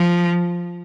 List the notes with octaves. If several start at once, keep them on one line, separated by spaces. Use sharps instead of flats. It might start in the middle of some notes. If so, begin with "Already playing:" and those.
Already playing: F3